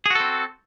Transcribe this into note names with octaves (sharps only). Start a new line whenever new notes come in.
C4 F#4 G#4 A4